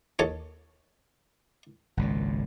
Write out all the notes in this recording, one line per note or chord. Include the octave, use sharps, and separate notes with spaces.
D#2 A4 C#5
G#1 C#2 A#2